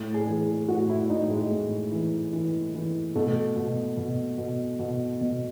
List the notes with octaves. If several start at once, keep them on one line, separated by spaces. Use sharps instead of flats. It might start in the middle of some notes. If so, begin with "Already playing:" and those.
Already playing: A2
G#4
E3
G#4
A2 F#4
E4
A2 D#4
G#3
A2
E3
E3
E3
B2 A3
B2
B2
B2
B2
B2